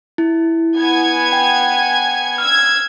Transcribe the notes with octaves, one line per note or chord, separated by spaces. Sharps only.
E4
B3 G#5 G#6
G5
E6 F6 G#6